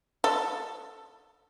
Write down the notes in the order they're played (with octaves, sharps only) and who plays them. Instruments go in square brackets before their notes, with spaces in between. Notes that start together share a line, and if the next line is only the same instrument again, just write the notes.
[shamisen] A4